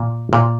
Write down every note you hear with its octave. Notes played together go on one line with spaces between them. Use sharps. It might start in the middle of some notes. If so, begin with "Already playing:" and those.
Already playing: A#2
A#2